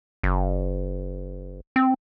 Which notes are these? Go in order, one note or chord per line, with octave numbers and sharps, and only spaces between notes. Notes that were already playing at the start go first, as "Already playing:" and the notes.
F#1
C4